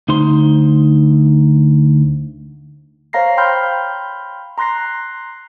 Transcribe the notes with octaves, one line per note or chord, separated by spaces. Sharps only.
D2 D#4 C5 C6
C5 C#5 F5 A#5 A#6 C7
G5 B5 C6 F6 G6
A#5 C6 F#6 A#6 C7